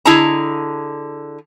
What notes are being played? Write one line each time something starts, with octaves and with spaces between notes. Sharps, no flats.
D3 E4 G#4 D#5 A5 A#5